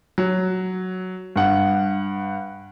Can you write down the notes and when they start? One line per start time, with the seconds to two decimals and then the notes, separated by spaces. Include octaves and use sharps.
0.18 F#3
1.36 G2 F#5